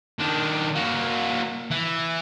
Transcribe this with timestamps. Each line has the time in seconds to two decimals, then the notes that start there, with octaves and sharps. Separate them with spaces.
0.19 D#3 D4
0.75 A#3 F#4
1.71 E3